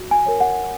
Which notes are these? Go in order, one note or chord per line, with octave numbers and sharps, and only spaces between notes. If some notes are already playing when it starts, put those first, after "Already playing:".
Already playing: F#4
G#5
A#4 C#5
F#5